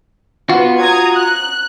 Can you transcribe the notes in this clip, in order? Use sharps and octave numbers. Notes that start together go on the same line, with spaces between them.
B3 F4 F#4
A#5 D#6 G#6
F#6